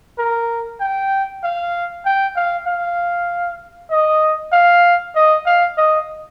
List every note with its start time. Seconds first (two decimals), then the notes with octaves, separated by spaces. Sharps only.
0.18 A#4
0.80 G5
1.43 F5
2.05 G5
2.36 F5
2.67 F5
3.91 D#5
4.52 F5
5.15 D#5
5.45 F5
5.77 D#5